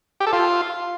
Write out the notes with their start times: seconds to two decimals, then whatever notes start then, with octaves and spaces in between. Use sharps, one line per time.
0.20 G4
0.27 A4
0.33 F4